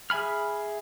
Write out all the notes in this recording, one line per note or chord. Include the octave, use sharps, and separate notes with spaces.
G#4 E5 G#5 B5 F6